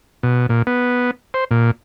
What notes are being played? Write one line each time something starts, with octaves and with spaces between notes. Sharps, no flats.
B2
A#2
B3
C5
A#2